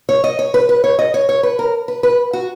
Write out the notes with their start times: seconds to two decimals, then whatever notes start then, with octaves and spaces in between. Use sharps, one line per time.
0.09 C#5
0.24 D#5
0.39 C#5
0.54 B4
0.69 B4
0.84 C#5
0.99 D#5
1.14 C#5
1.29 C#5
1.43 B4
1.59 A#4
1.88 B4
2.03 B4
2.33 F#4